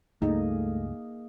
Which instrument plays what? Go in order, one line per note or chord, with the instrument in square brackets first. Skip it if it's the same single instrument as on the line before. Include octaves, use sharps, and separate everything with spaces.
[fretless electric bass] C#2 G2 [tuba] A3 [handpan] A#3 G#4 D#5 [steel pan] D#4